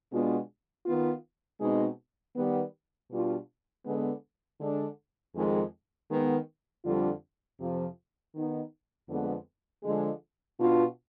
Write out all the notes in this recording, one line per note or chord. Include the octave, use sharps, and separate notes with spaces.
B2 G#3 B3 D4 F4
D#3 B3 F4
B2 G#3 C4 D#4
D#3 G3 B3
B2 G3 D4 F4
D3 G#3 B3
D3 G#3 D4
F2 D#3 G#3
D#3 G#3 B3
F2 D3 G3 D4 F4
F2 C3 F3
D#3 B3 D#4
F2 D3 G#3 B3
D3 F3 G#3
B2 B3 D4 F4